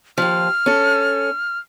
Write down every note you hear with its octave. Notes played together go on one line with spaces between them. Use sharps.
D#2 F3 F6
C#4 A4